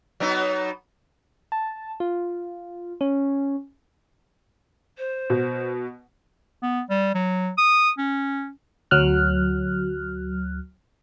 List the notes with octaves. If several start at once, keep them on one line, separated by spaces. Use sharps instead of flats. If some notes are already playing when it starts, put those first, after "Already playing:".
F#3 B3 D#4
A5
F4
C#4
C5
B2
B3
G3
F#3
D#6
C#4
D2 F#3 F6 F#6